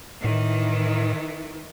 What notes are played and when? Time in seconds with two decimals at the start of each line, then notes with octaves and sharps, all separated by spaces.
0.24 A2 D#3 E3